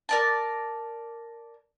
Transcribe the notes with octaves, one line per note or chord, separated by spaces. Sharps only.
A#4 D5 A5